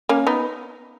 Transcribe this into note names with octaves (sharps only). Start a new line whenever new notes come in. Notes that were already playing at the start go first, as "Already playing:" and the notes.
A#3 C#4
B3 D#4